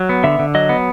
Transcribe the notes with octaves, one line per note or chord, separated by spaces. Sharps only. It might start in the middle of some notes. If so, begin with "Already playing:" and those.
Already playing: F#3
B3
D3 E5
D3
F#3 D#5
B3